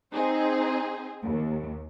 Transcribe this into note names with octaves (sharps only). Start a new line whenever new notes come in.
C4 D#4 G#4 C5
D#2